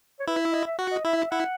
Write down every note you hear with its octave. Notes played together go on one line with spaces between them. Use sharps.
C#5
E4 B4
E5
D#5
E5
F#4 F#5
D#5
E4 E5
E5
E4 F#5